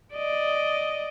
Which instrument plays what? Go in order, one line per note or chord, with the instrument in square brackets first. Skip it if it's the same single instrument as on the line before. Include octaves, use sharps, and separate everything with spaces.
[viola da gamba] D5 D#5